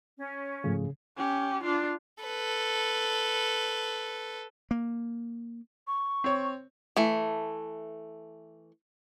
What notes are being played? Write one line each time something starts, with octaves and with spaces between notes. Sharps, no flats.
C#4
G#2 C#3 F3 A3
C#4 G4
D4 F4
A4 B4
A#3
C#6
C4 C#5
E3 A3